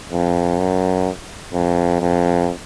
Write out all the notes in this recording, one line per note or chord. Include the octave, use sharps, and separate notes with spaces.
F2
F#2
F2
F2